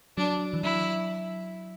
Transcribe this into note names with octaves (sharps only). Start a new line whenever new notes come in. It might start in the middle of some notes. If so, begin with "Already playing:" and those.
F#3 D4
E3
F#3 E4